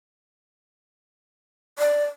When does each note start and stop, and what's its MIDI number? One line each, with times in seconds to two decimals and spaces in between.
1.79 2.05 74